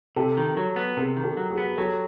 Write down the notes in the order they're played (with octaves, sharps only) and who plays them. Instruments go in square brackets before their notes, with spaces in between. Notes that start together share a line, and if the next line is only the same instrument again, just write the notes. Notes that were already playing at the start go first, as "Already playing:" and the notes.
[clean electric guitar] C3 [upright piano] G4 A4
[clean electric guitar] D#3
F#3
B3
[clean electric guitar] C3 [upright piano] G#4 A#4
[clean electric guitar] D#3
[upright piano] G4 A4
[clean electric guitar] F#3
[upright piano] F#4 G#4
[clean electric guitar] B3
[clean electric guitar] F#3 [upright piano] G4 A4